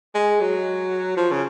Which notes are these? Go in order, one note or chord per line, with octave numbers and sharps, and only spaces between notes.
G#3
F#3
F3
C#3